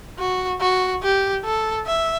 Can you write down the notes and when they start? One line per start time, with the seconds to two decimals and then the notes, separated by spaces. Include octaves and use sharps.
0.19 F#4
0.61 F#4
1.02 G4
1.45 A4
1.86 E5